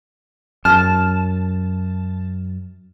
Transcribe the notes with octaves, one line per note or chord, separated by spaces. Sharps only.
F#2 A5 F6